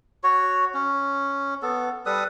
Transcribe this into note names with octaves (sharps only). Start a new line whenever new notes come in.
F#4 C#5
C#4
B3 A4
G3 A4 B4 D#6